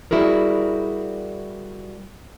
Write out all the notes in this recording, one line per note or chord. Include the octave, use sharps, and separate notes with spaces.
G3 E4 F#4 G#4 A#4